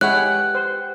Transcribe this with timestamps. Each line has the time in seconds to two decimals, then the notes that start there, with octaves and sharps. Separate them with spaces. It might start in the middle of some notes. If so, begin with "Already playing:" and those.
0.01 G#3 E4 G4 B4 C#5 F#5 F#6
0.55 C5